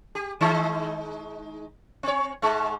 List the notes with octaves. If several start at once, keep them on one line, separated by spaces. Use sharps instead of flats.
G4
D#3 G#3 D#4
C4 C#5
G#2 G#3